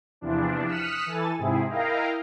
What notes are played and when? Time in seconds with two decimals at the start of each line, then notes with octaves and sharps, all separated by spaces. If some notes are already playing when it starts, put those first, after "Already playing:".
0.21 E2 C3 E3 F3 D4
0.67 D#6 F6 F#6 B6 C#7 E7
1.06 E3 A4 G#5 A6
1.38 G#2 C3 C4 E4 G#4
1.69 E4 A#4 D#5 F5 G5 A#5